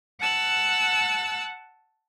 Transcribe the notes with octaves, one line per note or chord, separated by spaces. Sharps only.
F#5 A5 E6 F#6